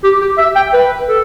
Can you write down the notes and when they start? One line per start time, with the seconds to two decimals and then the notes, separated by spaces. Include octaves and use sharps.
0.04 G4
0.21 G4
0.38 E5
0.56 G5
0.73 B4
1.09 A4